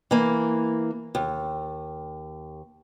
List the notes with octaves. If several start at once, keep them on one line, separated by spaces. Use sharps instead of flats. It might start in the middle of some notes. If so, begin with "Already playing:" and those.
E3 A#3
D#2